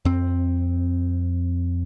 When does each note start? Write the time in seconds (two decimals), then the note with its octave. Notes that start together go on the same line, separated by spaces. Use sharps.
0.05 F2 C4